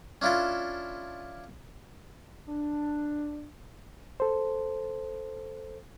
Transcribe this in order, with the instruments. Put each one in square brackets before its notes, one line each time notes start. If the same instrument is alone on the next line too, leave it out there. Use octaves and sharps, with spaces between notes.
[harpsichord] C#4 D4 E4 F4 A4
[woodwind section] D4
[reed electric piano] A4 C5